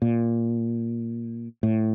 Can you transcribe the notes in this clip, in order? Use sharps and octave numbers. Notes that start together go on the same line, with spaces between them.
A#2
A2